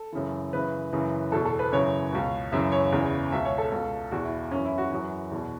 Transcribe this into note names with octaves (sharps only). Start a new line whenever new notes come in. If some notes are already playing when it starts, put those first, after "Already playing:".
Already playing: A4
F#2 C#3 E3
F#2 C#3 E3 B4
F#2 C#3 E3
E2 B2 A4
A4
B4
F#2 C#3 E3 C#5
C#2 B2
F#2 C#3 E3 E5
C#5
E2 C#3 E3
C#2 B2 E5
C#5
A4
C#2 B2
E2 B2 F#4
E4
F#2 E3 C#4
E4
F#4
F#2 E3 F#4
E2 B2